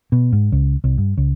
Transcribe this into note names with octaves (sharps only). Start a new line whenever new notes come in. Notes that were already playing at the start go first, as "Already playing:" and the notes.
B2
G#2
C#2
C2
G2
C#2